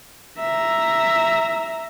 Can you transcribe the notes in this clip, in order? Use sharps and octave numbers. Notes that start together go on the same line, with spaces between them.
E5 A#5